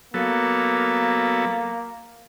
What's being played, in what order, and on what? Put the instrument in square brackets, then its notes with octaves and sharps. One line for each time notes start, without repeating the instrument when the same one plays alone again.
[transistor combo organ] F#3 B3 A4 [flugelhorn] A#3